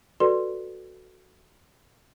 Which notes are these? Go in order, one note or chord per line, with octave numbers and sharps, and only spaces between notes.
F#4 A4 B4 D5 C6